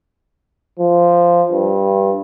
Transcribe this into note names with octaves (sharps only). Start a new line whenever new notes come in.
F3
G2